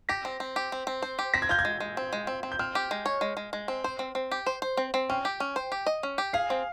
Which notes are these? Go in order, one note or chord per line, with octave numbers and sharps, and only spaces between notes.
G4 A#6
C4
C4
G4
C4
C4
C5
G4
C4 A#6
G#6
F4 G6
G#6
G#3
G#3
C4
G#3
C4
C4
G6
C4 F6
G4
G#3
C#5
G#3
G#3
G#3
C4
C5
C4
C4
G4
C5
C5
C4
C4
C#4 G5
G4
C#4
C5
G4
D#5
C#4
G4
G#4 F5
C4